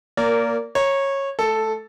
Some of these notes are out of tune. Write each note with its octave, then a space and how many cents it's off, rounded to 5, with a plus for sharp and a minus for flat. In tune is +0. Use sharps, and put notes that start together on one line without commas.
A#3 +0 A#4 -15 D5 -30
C#5 -15 A#5 +15
A3 -35 A4 +0